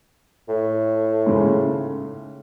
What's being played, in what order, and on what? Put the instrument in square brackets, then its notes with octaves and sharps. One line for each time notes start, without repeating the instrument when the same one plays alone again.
[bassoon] A2
[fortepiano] G#2 C#3